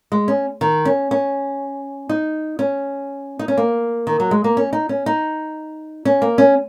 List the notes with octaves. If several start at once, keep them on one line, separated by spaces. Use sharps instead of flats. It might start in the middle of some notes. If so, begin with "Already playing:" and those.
G#3
C#4
D#3
C#4
C#4
D#4
C#4
D#4
C#4
A#3
D#3
F#3
G#3
A#3
C#4
D#4
C#4
D#4
C#4
A#3
C#4